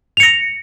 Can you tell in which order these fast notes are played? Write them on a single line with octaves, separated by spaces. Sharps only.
F7 C#7 A#6